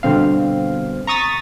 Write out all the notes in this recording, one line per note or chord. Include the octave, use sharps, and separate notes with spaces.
G2 B2 D3 C4 F5
A#5 C#6 D#6 A6 B6